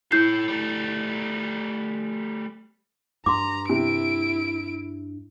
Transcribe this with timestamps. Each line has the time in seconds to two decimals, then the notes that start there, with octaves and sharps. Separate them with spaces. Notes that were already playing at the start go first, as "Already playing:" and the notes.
0.12 E4 A4 C#5 G6 C7
0.48 G3 A3
3.26 G2 A#5 C6 D6
3.69 C3 E4 D7